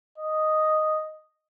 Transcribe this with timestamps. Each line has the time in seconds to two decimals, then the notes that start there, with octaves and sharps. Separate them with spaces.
0.18 D#5